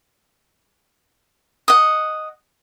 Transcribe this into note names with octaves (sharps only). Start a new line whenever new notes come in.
D#5 F#5